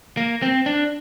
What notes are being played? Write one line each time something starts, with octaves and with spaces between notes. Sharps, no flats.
A#3
C4
D4